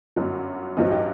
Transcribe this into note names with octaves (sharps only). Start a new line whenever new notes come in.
G1 F#2 F#3
A1 G2 F#3 C4 D#4
D#4 G4